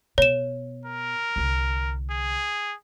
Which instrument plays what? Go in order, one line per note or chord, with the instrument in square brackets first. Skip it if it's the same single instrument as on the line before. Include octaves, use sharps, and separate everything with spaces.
[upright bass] B2 [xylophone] C#5 E7
[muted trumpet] A#4
[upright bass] C2 D3
[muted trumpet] G#4